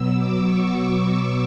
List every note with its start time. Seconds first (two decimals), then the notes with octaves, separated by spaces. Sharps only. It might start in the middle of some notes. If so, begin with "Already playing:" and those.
Already playing: B2 F#3 B3 E6
0.14 D6
0.42 C#6